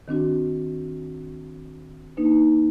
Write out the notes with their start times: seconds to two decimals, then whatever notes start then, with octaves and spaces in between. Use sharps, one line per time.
0.08 D#3 C4 D4 F#4
2.17 A#3 D4 D#4 B4